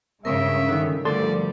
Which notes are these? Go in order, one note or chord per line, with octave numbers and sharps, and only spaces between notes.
G2 C#3 G#3 A#4 E5
D3 D#3
D2 F3 G3 A4 D5 C6